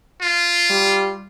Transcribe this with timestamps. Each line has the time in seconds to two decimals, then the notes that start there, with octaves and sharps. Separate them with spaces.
0.22 F4
0.70 G3